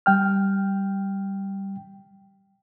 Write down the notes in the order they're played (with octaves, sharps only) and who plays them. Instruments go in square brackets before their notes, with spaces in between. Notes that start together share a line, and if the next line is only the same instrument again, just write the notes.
[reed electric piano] G3 G5 F6